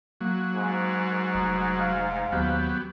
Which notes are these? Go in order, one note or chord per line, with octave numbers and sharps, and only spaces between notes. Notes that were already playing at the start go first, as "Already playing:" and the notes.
F#3 A#3
G#2 G#4
F1 D#4
F5
D#2 F#3 B3 G4